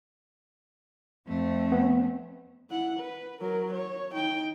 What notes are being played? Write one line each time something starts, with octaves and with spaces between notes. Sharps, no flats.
F2 A3 C4
B3
E4 F#5
B4
F#3 A#4
C#5
D#4 G5